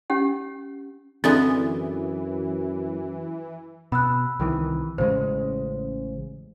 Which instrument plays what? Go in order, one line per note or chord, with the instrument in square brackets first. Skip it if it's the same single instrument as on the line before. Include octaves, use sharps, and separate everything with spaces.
[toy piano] C#4 G4 F#5
[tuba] F#2 [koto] D3 G#3 B3 [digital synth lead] E3 [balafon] C4
[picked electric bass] B2 [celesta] B5 E6 F#6
[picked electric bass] C2 D#3 E3
[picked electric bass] A1 C#3 G#3 [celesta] C5